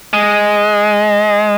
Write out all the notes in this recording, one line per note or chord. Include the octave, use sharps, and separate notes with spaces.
G#3